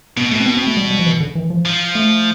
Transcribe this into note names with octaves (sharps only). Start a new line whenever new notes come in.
B2 B3
B2 A3
C4
B3
C4
A3
G3
G3
F3
E3
D3
E3
F3
F3
A3